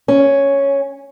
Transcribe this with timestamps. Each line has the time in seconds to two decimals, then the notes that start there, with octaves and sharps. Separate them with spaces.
0.08 C#4